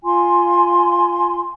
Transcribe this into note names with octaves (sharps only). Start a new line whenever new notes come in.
F4 G#5 C6